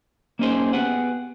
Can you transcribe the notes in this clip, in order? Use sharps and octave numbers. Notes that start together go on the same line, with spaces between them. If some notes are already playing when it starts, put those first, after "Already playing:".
A#3 C#4 D#4 G#4 C5
B3 G4 G#4 F#5